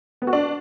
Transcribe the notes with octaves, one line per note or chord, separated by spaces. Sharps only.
B3
F#4
D4